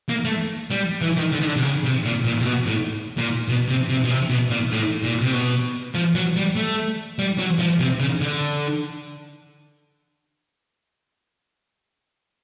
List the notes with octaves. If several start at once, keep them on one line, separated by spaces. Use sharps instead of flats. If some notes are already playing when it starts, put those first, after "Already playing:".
A#3
A3
G3
E3
D#3
D3
D#3
D3
C3
C#3
C3
A#2
A#2
C3
B2
A2
A#2
B2
C3
C3
B2
C3
B2
A#2
A2
A#2
C3
B2
F3
F#3
G3
A3
G3
F#3
F3
C3
C#3
D3